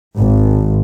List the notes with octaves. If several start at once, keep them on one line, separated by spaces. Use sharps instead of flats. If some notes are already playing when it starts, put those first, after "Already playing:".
G#1